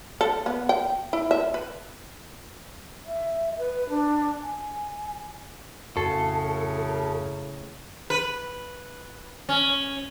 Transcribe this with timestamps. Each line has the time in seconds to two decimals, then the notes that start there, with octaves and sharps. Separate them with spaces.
0.21 A4
0.46 B3
0.69 G5
1.13 E4
1.31 E5
1.54 B4
3.05 E5
3.58 B4
3.90 D4
4.42 G#5
5.97 F2 A2 C#3 F#4 A4
8.10 B4
9.49 C#4